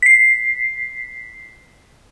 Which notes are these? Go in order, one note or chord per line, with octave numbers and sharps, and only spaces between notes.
B6 C7